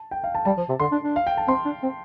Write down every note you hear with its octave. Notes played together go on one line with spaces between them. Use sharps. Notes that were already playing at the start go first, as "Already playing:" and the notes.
Already playing: A5
G5
F5
A5
G3 A5
F3
C3
D3 C6
D4
D4
F5
G5
A5
C4 C6
D4
C4